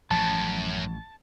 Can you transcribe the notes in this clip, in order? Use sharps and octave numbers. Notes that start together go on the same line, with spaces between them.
A1 F#2 F3 A5